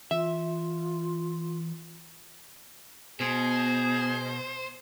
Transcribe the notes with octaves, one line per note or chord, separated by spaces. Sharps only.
E3 F4 E5
B2 B3 G#4 C5